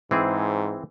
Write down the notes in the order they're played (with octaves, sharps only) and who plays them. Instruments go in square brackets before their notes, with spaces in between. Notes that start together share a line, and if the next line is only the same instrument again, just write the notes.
[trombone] G#2 [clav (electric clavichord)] E3 C4 G#4